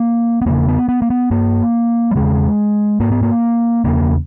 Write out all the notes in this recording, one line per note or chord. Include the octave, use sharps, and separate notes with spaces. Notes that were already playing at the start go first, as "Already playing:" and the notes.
Already playing: A#3
B3
E2 C#3 A#3
B3
B3
A#3
B3
G2 A#3
G3
E2 C#3 G#3
G#2 A#3
B3
A#3
E2 C#3 A#3